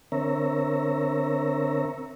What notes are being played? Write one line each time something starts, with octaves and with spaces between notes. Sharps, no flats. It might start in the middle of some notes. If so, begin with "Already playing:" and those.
D3 C4 A#4 C#5 E5 A#5